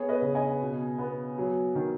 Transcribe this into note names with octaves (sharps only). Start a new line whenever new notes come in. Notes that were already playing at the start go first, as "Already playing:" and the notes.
Already playing: B3 G#4 C#5
B4 D#5
C#3
D#5 G#5
B2
B3
F#3
D#3